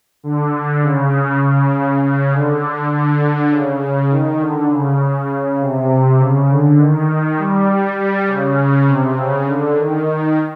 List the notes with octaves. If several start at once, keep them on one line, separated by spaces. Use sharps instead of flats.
D3
C#3
C#3
C#3
D3
D3
C#3
D#3
D3
C#3
C3
C#3
D3
D#3
G3
G3
C#3
C3
C#3
D3
D#3